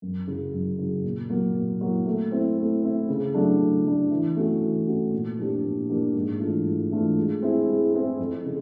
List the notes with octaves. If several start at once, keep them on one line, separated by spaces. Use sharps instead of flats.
F#2
C#3 F#3
F#2
C#3 F#3
A#2
F#3 A#3
A#2
F#3 A#3
A3
C4 E4
A3
C4 E4
C#3
F#3 A3 D4
C#3
F#3 A3 D4
E3
A3 C#4 F#4
E3
A3 C#4 F#4
A#2
F3 A#3 D4 G4
A#2
F3 A#3 D4 G4
G#2
E3 A3 D4 F4
G#2
E3 A3 D4 F4
G#3
C4 E4 G#4
G#3
C4 E4 G#4
F2
C#3